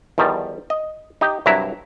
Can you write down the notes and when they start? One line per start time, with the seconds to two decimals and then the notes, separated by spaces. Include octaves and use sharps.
0.18 E2 D#3 F3 G3
0.70 D#5
1.21 D#4 G4
1.46 C2 G2 F#3 E4 E5 A#5